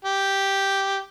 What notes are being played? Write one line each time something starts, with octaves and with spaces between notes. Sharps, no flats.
G4